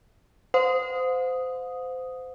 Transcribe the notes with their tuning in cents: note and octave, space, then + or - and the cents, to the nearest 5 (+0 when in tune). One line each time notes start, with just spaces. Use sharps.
C5 -25 F5 +45 D#6 +0